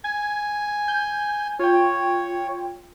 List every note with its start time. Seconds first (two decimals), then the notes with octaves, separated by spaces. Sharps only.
0.04 G#5 G#6
0.88 G6
1.59 F4 C#5 G5